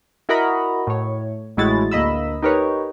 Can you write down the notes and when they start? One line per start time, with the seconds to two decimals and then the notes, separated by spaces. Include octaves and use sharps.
0.29 E4 F#4 A#4 D#5 A#5 B5
0.87 A2 C#5
1.57 A1 A2 G#3 E4 F#4 A6
1.91 D2 A#3 D#5 B5 E6
2.43 D#4 G4 A#4 B4 C#5